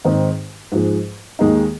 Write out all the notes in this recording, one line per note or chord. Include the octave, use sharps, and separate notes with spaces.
G#2 D#3 C4 D#4
G#2 F3 G#3
D#2 D#3 G#3 D#4